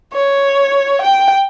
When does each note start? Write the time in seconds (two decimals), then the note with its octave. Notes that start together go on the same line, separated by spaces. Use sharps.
0.13 C#5
1.02 G5